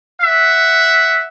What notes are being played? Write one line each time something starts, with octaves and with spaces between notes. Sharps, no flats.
E5 F#5